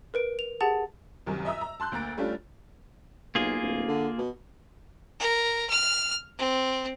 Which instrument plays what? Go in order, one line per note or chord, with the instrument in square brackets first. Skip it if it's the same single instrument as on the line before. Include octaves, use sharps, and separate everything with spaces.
[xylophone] A#4 B4 D7
F7
G4 G#4 F#5 A5 A6 F7
[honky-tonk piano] C#2 F#2 C3 D#3
D#5 E5 A#5 D#6 E6
A#5
A5 C6 F#6 G6
D2 A#3 A#5 A6 D7
G3 A3 C#4 D4 F4
[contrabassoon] B1 [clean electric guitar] A#3 F4 G#4
[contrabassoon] D1
D3
B2
[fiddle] A#4
F6
C4